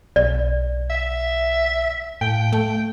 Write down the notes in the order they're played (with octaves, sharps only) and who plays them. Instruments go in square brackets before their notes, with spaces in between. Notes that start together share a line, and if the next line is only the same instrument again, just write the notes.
[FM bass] B1 [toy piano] D5
[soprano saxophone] E5
[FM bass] A2 [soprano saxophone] G5
[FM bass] A3